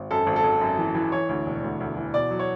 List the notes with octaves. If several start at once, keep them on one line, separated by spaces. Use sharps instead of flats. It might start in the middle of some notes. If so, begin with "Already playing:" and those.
Already playing: G#1
F#2 A4
G#1
A4
G#1
F#2
E3
E3
E3 C#5
D2
E1
D2
D2
E3
B2 D5
F#3
C#5